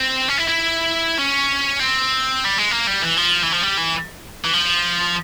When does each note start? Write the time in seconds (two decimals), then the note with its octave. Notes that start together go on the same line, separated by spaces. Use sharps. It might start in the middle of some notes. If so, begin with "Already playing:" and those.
Already playing: C4
0.29 C#4
0.39 E4
0.49 E4
1.19 C#4
1.80 C4
2.45 G3
2.58 G#3
2.71 A#3
2.87 G3
3.02 E3
3.17 F3
3.43 E3
3.52 F3
3.63 G3
3.77 E3
4.44 E3
4.53 F3